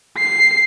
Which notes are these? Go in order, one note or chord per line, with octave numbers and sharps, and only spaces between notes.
C7